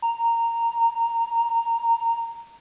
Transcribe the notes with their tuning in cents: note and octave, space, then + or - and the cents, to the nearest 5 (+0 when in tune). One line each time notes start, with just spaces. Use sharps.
A#5 -10